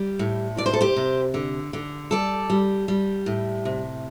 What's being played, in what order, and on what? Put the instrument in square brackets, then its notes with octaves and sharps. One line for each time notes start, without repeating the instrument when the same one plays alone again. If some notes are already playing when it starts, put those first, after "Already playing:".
Already playing: [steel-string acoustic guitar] G3
A2
C3 D5
C5
A4
G4 C5
C3
D3
D3
G3 A4 D5
G3
G3
A2
C3